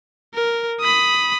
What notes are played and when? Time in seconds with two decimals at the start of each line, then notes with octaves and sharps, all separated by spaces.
0.34 A#4
0.80 B5 D#6